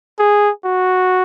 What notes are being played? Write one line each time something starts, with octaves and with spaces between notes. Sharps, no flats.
G#4
F#4